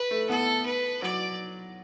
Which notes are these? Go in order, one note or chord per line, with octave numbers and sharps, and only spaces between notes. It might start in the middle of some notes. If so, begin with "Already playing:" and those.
Already playing: B4
A3
B3 A4
B4
F#3 D5